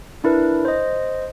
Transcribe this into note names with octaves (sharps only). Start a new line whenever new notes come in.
D4 E4 A#4 B4
C5 D#5